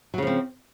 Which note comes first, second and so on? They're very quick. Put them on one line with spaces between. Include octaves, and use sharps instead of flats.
F#3 C#3 F3 C4